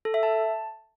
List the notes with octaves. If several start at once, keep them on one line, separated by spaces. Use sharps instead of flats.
A4
E5
A5